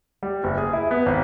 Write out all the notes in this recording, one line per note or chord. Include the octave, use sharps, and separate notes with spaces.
G3
F#1
G#4
E4
B3
G#1